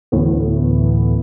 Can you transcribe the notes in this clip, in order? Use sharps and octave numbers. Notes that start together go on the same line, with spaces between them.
D2 A2 E3 A3 B3